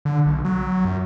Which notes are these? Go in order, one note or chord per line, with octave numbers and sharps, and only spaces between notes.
D3
B1
F#3
F#2